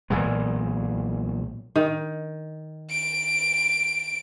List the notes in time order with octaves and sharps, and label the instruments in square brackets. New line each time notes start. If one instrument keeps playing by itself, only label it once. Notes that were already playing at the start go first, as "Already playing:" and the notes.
[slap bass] B1 A#2 E3 G#3
[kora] D#3
[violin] D7